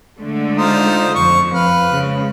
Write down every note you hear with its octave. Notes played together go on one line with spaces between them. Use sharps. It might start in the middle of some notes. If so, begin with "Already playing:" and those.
D3 G#3 A3
D#4 F4 C5
F2 C#6
B4 F5
C#3 G#3